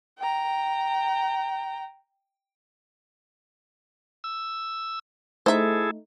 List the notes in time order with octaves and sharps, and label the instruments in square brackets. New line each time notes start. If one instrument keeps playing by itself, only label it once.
[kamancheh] G5 A#5
[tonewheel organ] E6
[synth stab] A3 D#4 [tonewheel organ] E4 G#4 A4 [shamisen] C5 E5